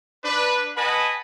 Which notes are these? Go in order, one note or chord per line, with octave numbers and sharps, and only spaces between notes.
D4 B4
B4 D#5 F#5 G#5 A5 B5